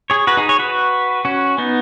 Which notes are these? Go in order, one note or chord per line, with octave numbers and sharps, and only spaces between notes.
G#4 C#5
F#4 B4
D#4 G#4
G#4 C#5
F#4 B4
C#4 F#4
B3 D#4